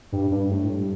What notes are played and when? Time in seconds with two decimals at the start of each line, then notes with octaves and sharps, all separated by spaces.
0.12 G2
0.31 G2
0.51 A2
0.69 G2